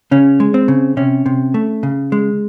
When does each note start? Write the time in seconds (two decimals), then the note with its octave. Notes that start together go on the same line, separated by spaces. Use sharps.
0.11 C#3 C#4
0.40 G#3
0.54 C4
0.68 C#3
0.97 C3 C#4
1.26 C3
1.54 A3
1.83 C#3
2.12 G#3